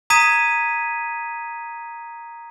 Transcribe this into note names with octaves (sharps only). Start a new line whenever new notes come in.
A#5 D#6 G#6 B6 D#7